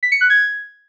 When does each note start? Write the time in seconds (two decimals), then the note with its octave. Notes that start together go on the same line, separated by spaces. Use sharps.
0.03 B6
0.12 C#7
0.21 F#6
0.30 G#6